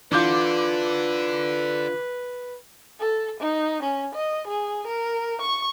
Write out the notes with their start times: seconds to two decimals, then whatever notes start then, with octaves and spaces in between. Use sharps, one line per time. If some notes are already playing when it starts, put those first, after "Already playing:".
0.12 D3 E3 D4 F4 B4 D6 G6
3.00 A4
3.40 D#4
3.82 C#4
4.15 D#5
4.47 G#4
4.87 A#4
5.41 C#6